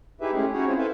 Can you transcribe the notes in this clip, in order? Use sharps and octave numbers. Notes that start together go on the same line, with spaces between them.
D#4 E4 G4 G#4 B4 E5
G#3 A3 C#4 G4 G#4
C#4 D#4 E4 F#4 G#4 C#5
C4 C#4 E4 F4 G#4 C5
E4 A4 B4 C5 E5 F5